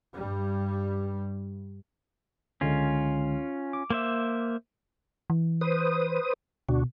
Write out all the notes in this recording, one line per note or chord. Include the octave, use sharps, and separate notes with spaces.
G2 G3
C#2 D3 G#3 C#4 F4
D6
A#3 C5 E5
E3
B4 C5 D#6
D2 B2 D4 F#4